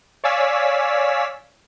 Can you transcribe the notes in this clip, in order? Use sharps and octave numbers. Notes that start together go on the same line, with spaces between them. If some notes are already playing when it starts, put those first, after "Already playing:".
C#5 D5 F5 G#5 E6 B6